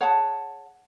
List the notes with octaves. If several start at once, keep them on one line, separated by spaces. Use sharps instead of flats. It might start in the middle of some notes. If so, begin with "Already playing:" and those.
G#4 C#5 F#5 A5